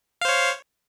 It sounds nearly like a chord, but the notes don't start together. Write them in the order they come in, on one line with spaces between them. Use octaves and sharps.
F5 C5 C#5